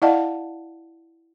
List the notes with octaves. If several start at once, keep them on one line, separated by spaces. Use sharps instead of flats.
E4 D5 D#5 F5 F#5 A5